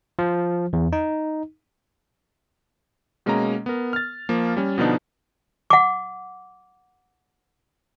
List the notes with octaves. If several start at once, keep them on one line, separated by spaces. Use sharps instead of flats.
F3
E2
D#4
B2 G#3 A#3 C#4 D#5 A#5
B3 A#4
F6 A6
F3 A#3
G3 C#4
B2 D3 F3 B3 D4 D#4
F#5 D6